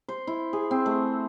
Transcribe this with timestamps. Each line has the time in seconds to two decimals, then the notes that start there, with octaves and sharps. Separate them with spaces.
0.09 C5
0.27 E4
0.53 G#4
0.71 C4
0.86 A3